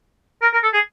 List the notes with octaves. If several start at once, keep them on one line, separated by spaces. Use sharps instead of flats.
A#4
A#4
A4
G#4